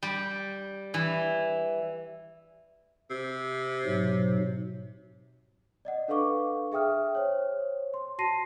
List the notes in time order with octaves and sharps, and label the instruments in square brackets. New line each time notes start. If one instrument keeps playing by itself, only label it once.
[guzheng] G3
E3
[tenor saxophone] C3
[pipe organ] G#2 B2 F#3
[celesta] D5 D#5 F#5
D4 A4 B4 F5 C#6 D6
G#4 E5 G5 D#6 F6
C5 C#5
C6
F#4 A5 C6 A#6 C7 D#7